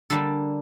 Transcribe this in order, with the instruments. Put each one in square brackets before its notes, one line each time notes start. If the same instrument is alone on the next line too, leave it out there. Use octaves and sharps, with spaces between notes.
[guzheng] D3 G3 A#3 D4 A4